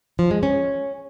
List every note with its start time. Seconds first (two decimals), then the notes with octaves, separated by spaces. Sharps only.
0.19 F3
0.31 G#3
0.43 C#4